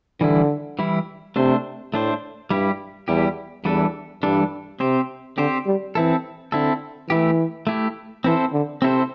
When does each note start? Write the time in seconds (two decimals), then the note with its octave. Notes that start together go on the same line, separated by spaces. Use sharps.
0.21 D3 E3 G3 E4
0.79 E3 G3 E4
1.36 C3 A3 D4 C5
1.93 A2 A3 D4 C5
2.50 G2 G3 E4 G4
3.08 E2 G3 E4 G4
3.65 E2 E3 G3 D4 A4
4.23 G2 E3 G3 D4 A4
4.80 C3 C4 G4 C5
5.38 D3 C4 G4 C5
5.66 G3
5.95 E3 C4 E4 A4
6.52 D3 C4 E4 A4
7.10 E3 A3 E4 G4
7.67 A3 E4 G4
8.24 E3 C4 E4 A4 C5
8.53 D3
8.82 C3 C4 E4 A4 C5